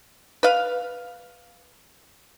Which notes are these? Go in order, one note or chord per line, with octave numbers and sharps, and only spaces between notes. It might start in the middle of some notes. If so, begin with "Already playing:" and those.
B4 F5